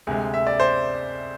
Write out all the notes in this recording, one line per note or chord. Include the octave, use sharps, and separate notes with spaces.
D2 C3 G#3 G#4
E5
D5
C5